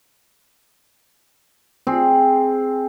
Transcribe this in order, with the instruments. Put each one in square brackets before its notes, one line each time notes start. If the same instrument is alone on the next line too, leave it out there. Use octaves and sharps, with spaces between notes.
[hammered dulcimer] C4 G#4